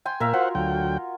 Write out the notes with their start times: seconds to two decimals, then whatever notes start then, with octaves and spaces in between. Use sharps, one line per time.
0.05 G5 G#5 C6
0.20 A#2 A#4 E5 F5
0.34 F4 F#4 C5 F#5
0.55 D2 F#3 G5